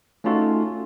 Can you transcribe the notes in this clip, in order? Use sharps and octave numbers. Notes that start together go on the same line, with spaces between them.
A3 C#4 D#4 F4 F#4 A4